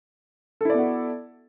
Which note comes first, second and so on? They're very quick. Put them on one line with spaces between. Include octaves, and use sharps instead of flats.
A4 E4 D5 B3 F#4